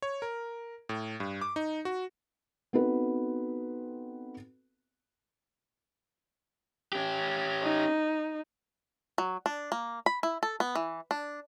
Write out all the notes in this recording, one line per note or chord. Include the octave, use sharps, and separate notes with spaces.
C#5
A#4
A2
G2
D6
D#4
F#4
B3 C4 D#4 F#4 A4 B4
C#4 G4
D#4
F#3
D4
A#3
B5
E4
A4
B3
E3
D4